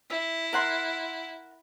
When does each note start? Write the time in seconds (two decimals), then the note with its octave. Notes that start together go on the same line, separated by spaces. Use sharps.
0.10 E4 E5
0.53 A#4 F#5 C6